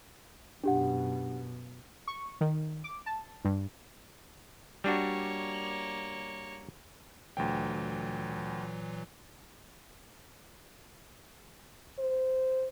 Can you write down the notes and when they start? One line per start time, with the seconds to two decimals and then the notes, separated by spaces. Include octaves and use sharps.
0.64 F#2 B2 D4 G4 F#5
2.08 C#6
2.41 D#3
2.84 D6
3.06 A5
3.45 G2
4.84 G3 A#3 D4 F#4 C#5
7.37 D2 A#2 E3 F#3 G5
11.99 C5